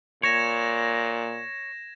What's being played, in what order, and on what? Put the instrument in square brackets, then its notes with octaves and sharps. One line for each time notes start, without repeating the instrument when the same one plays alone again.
[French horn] A#2 [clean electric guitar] C#5 [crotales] G#6 A#6 E7